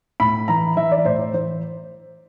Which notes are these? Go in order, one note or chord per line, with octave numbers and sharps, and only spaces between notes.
A2 B5
E3 A#5
E3 E5
D5
A2 C5
C5
E3 C5